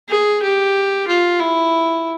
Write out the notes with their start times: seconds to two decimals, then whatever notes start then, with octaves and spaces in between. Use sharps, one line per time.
0.09 G#4
0.42 G4
1.08 F4
1.40 E4